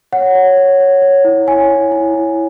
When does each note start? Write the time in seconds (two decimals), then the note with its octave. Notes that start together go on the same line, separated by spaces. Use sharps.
0.13 C#5 F#5
0.35 C#5
0.57 C#5
0.80 C#5
1.02 C#5
1.25 E4
1.47 C#5 G#5
1.70 E4
1.92 E4
2.14 E4